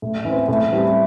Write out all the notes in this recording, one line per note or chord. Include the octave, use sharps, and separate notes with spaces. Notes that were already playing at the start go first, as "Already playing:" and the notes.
A2
E3
C4
A2
E3 G3 C4 G4